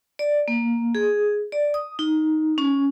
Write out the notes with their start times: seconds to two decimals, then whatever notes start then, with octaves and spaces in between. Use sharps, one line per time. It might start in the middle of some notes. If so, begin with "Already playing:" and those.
0.19 D5
0.48 A#3
0.95 G#4
1.52 D5
1.74 D#6
1.99 D#4
2.58 C#4